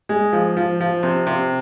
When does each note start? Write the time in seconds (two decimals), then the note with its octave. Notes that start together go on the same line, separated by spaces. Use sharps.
0.09 G#3
0.33 F3
0.57 F3
0.80 F3
1.03 C3
1.27 C3